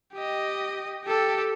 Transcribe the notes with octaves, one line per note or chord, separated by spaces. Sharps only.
G4 D#5
G4 A4